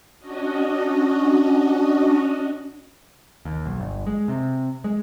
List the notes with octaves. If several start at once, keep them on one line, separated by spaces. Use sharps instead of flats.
C#4 D4 F#4 D#5
D#2
B1
G1
G#3
C3
G#3